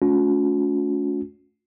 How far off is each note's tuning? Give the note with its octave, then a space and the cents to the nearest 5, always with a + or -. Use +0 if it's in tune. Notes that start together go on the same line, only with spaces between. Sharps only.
A3 -30 C#4 +30 F#4 -45